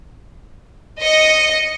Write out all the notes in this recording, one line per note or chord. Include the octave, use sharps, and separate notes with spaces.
D#5 C#7